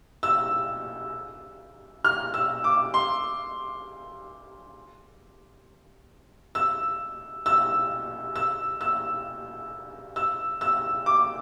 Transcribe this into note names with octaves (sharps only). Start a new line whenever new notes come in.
E6
F6
E6
D6
C6
E6
E6
E6
E6
E6
E6
D6